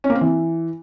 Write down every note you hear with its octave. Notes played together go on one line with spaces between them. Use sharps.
C#4
A#3
C4
E3